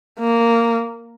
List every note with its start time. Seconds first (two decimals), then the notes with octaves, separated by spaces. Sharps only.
0.19 A#3